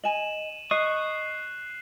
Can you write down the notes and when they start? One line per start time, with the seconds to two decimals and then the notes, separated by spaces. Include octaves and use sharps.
0.04 D#5 G#5 D#7 E7 F#7
0.71 D#5 C#6 D#6 F#6 C7